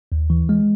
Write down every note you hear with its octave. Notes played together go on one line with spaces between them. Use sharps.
D#2
E3
G#3